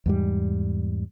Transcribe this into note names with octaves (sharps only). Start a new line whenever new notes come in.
E2 G#2 G3